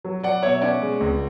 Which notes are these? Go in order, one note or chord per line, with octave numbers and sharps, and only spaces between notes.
F#3
F#3 D5 F#5
B2 C#5 E5
C#4 D5 F#5
G#3
C#2